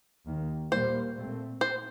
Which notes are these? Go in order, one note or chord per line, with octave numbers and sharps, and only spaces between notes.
D#2 D#3 A#3
A#2 G3 A#3 C5
A#2 A3 C4
C5